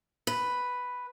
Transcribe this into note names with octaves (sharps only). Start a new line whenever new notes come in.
B4